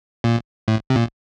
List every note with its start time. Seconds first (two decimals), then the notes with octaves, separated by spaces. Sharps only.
0.24 A#2
0.68 A2
0.90 C3
0.96 A#2